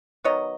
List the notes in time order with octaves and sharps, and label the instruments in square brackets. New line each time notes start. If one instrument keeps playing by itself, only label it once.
[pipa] D#3 F#3 B3 C#5 D#5